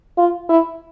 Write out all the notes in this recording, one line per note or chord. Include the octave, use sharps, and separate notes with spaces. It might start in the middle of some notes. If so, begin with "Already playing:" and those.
F4
E4